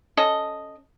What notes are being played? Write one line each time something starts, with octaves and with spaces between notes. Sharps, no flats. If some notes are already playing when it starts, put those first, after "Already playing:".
C#4 A4 D#5